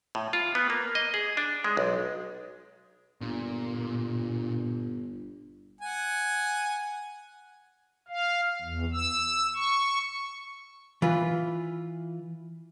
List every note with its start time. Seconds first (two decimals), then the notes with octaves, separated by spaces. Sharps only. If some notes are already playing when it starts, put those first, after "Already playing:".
0.15 A2
0.33 F4
0.55 B3
0.70 A#3
0.95 D#5
1.14 G#4
1.37 D4
1.64 G#3
1.77 B1
3.21 G1 A#2
5.81 F#5 G#5
8.08 F5
8.61 E2
8.93 E6
9.55 C#6
11.02 E3 F4 B4